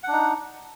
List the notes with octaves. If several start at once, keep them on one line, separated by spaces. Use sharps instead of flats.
D4 D#4 F#5